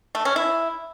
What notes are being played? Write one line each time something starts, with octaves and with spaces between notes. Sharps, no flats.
A3
C#4
E4